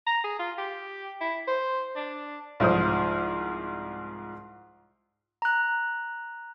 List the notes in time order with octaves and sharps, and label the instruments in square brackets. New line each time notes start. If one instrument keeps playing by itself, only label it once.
[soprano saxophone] A#5
G#4
F4
G4
E4
C5
D4
[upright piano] C2 G#2 F3 C5 D#6
[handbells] A#5 F#6